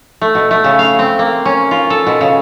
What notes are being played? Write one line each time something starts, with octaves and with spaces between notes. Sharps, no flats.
A3
B2
A3
C#3
F5
C4
A#3
C#4
F4
A4
B2
C#3